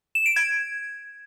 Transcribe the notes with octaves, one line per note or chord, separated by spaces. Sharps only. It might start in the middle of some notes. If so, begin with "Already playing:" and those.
E7
D7
G#6